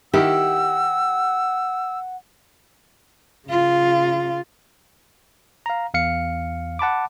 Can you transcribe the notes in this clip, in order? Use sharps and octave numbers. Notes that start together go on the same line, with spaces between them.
D#3 E4 G4 F#5 E6
C#3 F4
F5 A#5
E2 F5 C#7
F#5 A5 B5 D6